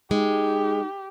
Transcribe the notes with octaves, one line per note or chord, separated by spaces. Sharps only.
G#3 D#4 G4